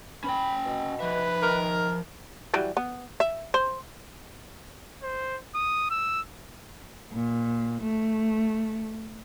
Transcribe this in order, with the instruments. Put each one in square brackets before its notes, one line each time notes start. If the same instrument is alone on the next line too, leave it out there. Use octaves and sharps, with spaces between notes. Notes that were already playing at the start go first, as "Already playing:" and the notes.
[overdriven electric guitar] C#4 G5 [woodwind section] B5
[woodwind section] B2
[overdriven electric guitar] F3 E5 [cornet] B4
[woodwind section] D#3 [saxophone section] A#4
[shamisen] E3 F#3 G3
B3
E5
C5
[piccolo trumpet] C5
D#6
E6
[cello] A#2
A3